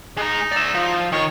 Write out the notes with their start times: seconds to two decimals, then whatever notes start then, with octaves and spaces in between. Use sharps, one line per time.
0.17 G#3 D#4 A#5
0.52 D5 E5
0.75 F3
1.12 D#3 C#5